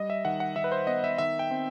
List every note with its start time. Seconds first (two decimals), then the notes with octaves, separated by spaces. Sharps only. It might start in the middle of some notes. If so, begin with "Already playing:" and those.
Already playing: G3 D#5
0.10 E5
0.25 D#3 F#5
0.40 F#5
0.56 D#3 E5
0.64 B4
0.72 C5
0.87 B3 D#5
1.04 E5
1.18 D#3 E5
1.39 G5
1.51 C4